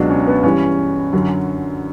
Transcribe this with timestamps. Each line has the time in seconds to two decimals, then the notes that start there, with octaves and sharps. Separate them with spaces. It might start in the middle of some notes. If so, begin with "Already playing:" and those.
Already playing: C#2 B2 F#3 D4
0.10 C#4
0.27 B3
0.43 G2 E3 C#4
1.13 F#2 D3 F#3